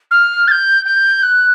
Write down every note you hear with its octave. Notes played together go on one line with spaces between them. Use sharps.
F6
A6
G6
G6
F#6